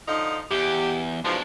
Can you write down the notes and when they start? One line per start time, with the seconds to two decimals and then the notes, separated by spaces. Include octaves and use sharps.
0.08 D3 F3 D#4
0.51 E2 G4
1.25 G#2 B2 F3 D4 C#5